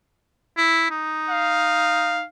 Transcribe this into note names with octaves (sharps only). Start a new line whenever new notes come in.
E4
D#4
F5